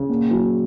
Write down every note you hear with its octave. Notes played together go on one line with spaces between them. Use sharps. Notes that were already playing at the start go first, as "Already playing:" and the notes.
Already playing: C#3
A#2
F#3